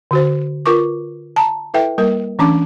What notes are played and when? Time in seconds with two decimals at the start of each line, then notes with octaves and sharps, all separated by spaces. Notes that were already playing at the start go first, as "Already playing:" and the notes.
0.11 D3 F#4 C5
0.66 F4 A#4 B4 C#6 D6
1.36 A5 A#5
1.74 E4 A4 B4 E5 G5
1.98 G3 A#3 A#4
2.39 E3 A3 C#4 D4 A5 D6